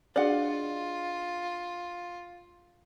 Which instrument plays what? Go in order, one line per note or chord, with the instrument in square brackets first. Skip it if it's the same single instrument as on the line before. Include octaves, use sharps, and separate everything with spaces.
[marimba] D4 F#4 G#4 [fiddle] F4 [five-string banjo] D5 D#5 F#5